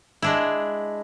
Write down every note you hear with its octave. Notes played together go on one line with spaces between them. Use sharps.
G#3 D4 E4